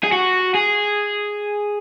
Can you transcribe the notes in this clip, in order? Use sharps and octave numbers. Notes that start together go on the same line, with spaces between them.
G#4
F#4
G#4